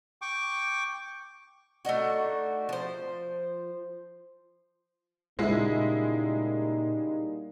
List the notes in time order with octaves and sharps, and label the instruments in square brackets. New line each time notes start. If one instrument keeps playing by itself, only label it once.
[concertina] G5 C#6 D6
[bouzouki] A3 D4 D#4 F#4
F3 C5
[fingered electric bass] A#2 C#3 [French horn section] G3 A#3 D#4 [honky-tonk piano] G#3 E4